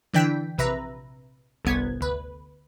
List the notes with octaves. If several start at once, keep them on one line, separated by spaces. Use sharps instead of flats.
D3 E3 D4 G5 B6
A#1 C3 B4 E5 A#5
G1 C2 B3 G#6
D2 B4